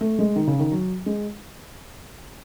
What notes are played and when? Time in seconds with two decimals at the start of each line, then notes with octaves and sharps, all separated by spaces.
0.01 A3
0.19 G#3
0.36 D#3
0.47 C#3
0.59 D#3
0.72 F#3
1.06 G#3